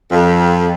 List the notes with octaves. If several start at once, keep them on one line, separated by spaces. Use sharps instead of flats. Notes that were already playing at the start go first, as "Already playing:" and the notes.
F2